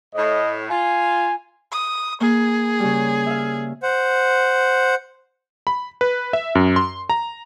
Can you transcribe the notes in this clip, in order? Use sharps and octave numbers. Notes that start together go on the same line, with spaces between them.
A2 D#5
F4 G#5
D#6
A#3 G#4
C#3 G3
E5 F5
C5 F#5
B5
B4
E5
F#2
C6
A#5